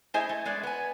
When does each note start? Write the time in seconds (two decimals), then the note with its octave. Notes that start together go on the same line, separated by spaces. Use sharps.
0.14 A3 E4 G#4 C5 D#5 G#5
0.29 A3
0.45 G#3 B3 D5
0.63 B3 G#5